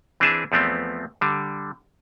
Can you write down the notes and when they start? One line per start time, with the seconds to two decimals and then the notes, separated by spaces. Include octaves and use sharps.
0.20 E3 C4 D4 G#4 E5 A5
0.52 E2 F3 A3 B3 C4
1.21 D3 G3